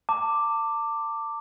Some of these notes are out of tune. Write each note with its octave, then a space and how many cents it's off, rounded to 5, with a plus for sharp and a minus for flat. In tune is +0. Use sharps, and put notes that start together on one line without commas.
A5 +35 D6 +0